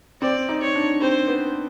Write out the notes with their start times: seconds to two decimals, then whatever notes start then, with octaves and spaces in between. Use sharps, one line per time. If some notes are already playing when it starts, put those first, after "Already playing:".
0.22 C4 D5
0.49 D#4
0.61 C#5
0.75 D4
1.01 C4 C5
1.28 B3